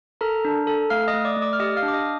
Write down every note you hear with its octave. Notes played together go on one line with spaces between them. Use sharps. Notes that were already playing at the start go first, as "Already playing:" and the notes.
A4 A#4 A#5
D4
A4
A3 F5 F6
D#5 D#6
A3
D5 D6
A3
D5 D6
F6
G4 D#5 D#6
F5 F6
D4
D6
D#5 D#6